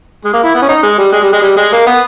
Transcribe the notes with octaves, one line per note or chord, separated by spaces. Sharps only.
G#3
A#3
E4
B3
C#4
D#4
G#3
G3
G#3
G3
G#3
G3
G#3
A#3
B3